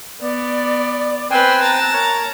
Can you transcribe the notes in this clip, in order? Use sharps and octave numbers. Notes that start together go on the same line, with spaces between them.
B3 D5
C4 B4 C5 G5 G#5 F#6
A5 A#5
A#4 C#5